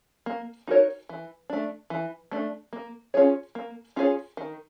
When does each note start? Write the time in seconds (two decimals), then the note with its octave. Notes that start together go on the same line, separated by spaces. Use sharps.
0.26 A#3
0.67 D#4 F#4 A#4 C#5
1.09 E3
1.50 A3 D4
1.90 E3
2.31 A3 D4
2.73 A#3
3.14 C#4 F4 G#4 C#5
3.55 A#3
3.96 C#4 F4 G#4 C#5
4.37 D#3